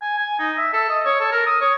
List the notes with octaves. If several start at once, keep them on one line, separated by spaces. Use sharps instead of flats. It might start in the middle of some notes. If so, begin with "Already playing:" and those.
G#5
G#5
D#4
E5
A4
D#5
C#5
A4
A#4
D#6
C#5